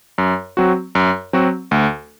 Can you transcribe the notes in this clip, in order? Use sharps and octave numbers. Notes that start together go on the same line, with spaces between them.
F#2
F#3 C4 F#4
F#2
F#3 C4 F#4
D2